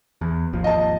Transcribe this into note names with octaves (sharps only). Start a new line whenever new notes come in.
E2
G#1 D#2 F3
D#5 A5